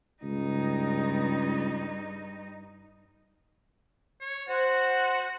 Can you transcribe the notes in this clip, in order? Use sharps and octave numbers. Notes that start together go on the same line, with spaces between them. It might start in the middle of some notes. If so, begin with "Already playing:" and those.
C#2 G2 D#4
C#5
F#4 C5 F#5